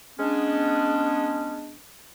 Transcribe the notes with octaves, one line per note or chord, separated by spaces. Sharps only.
G#3 B3 C#4 D4